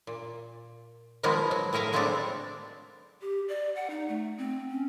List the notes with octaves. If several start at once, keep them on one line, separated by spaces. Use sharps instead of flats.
A#2
D#3 F3 F#3 G#3 A#3 B3
F#3
A2 G#4 A#4 E5 F5
F#3 G#3 A3 B3 C4 D4
G4
D5
F#5
D#4
A3
C4
C#4